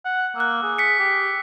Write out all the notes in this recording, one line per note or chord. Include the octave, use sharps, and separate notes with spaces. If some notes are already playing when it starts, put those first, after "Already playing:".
F#5
A#3 E6 F#6
G#4
B6 C#7
G4